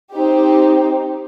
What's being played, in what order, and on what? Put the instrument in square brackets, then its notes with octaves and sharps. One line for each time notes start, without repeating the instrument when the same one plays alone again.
[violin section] C4 D#4 G4